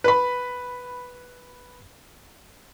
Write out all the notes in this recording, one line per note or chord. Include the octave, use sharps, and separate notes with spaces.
B4 B5